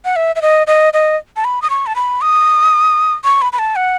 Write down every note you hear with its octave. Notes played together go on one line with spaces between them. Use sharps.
F#5
E5
E5
D#5
D#5
D#5
A5
B5
D#6
C#6
A5
B5
D#6
C#6
B5
B5
A5
F#5